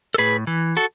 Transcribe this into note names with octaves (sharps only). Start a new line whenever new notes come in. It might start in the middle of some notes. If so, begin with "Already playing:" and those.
A4
A2 G#4 B4
E3
F#4 A4